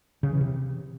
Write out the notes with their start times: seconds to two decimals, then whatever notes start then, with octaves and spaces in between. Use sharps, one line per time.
0.23 C#3
0.32 E3
0.41 C3